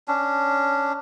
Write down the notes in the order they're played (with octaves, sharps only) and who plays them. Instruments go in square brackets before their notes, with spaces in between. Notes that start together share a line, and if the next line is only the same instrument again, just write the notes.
[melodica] C#4 D4